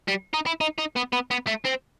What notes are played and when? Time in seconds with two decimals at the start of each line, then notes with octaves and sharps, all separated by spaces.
0.08 G3
0.34 D#4
0.46 E4
0.61 D#4
0.78 D#4
0.96 B3
1.13 B3
1.31 B3
1.47 A3
1.65 C4